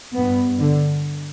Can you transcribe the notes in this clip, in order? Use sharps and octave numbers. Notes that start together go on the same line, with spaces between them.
G2 B3
D3